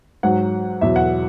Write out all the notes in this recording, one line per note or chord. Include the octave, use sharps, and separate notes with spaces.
G#2 F#3 F#5
E2 B2 F#3 E5
F#5